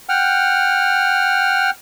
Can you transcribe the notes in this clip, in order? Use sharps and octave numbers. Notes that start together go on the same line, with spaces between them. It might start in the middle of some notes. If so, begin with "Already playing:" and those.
F#5 G5 F6